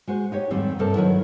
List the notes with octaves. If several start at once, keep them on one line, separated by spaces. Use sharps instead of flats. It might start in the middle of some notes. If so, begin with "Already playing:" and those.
G#3 F#4 C5
D#4 G4 C#5
F2 G#2 D#3 G3 C4
G2 C3 A4 A#4 C5 A5
D#3 F#3 E4 F#4